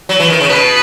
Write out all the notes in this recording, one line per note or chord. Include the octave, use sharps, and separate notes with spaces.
F#3
E3
D#3
C#3
B2 B4